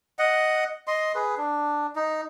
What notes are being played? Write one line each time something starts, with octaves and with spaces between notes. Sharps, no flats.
D#5 F#5
D#5 C6
G#4 B4
D4
D#4